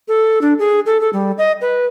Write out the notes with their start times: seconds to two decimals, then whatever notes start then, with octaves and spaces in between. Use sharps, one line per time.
0.08 A4
0.41 D4
0.59 G#4
0.86 A4
1.01 A4
1.13 G3
1.38 D#5
1.61 B4